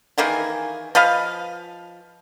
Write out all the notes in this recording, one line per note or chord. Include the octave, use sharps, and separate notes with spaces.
D#3 E3 A#3 G#4
F3 B4 D#5 F5